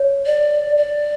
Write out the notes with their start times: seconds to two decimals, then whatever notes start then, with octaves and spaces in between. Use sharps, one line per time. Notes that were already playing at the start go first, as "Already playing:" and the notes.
Already playing: C#5
0.26 D5
0.77 D5